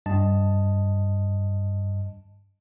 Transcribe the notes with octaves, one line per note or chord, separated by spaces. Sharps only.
G2 D#5 A5